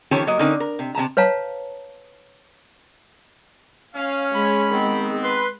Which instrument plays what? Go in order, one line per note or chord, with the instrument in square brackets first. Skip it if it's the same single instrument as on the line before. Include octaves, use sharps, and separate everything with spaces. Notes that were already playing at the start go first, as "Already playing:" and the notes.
[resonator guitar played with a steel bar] D#3 F3 C#4 G4 A4 C#5
F#3 A#3 D#5
D3 C4 C#4 D#4 A#4
A#4
C3
C3 A3 A5 A#5
[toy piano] B4 C#5 F5 A5 A#5
[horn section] C#4 [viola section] F5
[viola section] G#3 [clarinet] B5
[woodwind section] D#3 B3 C4
[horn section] B4 [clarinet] C6